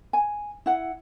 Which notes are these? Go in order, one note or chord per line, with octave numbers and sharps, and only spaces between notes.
G#5
E4 F#5